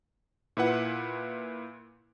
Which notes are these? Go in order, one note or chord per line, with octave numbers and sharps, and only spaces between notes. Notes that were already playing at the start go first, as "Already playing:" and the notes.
A#2 E4 B4 F#5